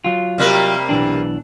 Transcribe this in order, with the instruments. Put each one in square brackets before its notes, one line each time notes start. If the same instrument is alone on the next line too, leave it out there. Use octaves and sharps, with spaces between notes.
[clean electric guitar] F#3 F4
[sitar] C3 G3 A#3
[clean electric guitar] B1 E3 D4